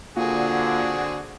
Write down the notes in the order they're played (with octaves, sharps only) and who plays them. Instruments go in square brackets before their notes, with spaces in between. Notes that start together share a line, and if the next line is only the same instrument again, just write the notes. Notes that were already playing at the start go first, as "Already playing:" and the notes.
[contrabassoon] A#2 [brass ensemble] D3 [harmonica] C4 G#4 [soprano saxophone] F#4